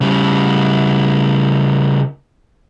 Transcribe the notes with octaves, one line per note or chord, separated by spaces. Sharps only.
C#3 G3